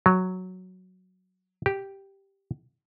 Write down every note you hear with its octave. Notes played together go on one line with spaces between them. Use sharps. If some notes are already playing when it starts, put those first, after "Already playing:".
F#3
G4